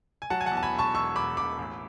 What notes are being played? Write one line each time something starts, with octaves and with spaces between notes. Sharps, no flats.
G#5
F#3 F#5 A5
G#5
F#5 A5
E2
A5
G#5 B5
E1
A5 C#6
E1 C#6 E6
E1 B5 D6
E1 B5 D6
A1